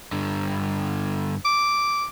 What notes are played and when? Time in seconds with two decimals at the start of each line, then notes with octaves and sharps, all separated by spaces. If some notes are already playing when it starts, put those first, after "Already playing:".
0.12 G2 D3
1.45 D6